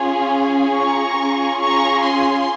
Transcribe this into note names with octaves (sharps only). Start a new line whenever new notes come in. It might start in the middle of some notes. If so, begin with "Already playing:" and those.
Already playing: C#4 F4 G#4
A#5 C#6
C#4 F4 G#4
A#5 C#6
G#5 C6